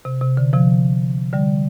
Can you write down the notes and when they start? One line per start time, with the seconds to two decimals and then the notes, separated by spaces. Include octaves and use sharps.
0.05 C3
0.21 C3
0.37 D3
0.53 C3 F3
1.33 D3 G3